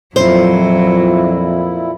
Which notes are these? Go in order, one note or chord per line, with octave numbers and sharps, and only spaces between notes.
F2 A#2 F#3 E4 C5